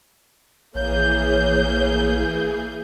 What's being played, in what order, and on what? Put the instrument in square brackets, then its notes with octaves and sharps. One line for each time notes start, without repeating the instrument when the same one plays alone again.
[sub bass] A#1 [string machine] E3 G#4 [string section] A#3 G6 [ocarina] C#5